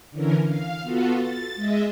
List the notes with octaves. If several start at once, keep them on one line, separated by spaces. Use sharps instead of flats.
D3 E3 C#4 A#4
F5
B3 F4 F#4 A4
A6
G#3 D#5 E5